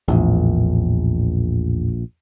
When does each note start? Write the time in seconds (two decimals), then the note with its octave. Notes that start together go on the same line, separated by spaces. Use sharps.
0.08 A#1 E2 A2